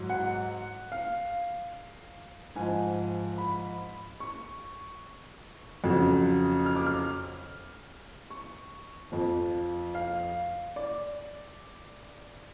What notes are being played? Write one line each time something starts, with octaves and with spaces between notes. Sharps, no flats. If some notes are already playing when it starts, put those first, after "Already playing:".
Already playing: G#2 F#3
F#5
F5
G#2 F3 G#5
B5
C#6
F2 C#3 F#3
F6
D6
F6
C#6
F2 F3
F5
D5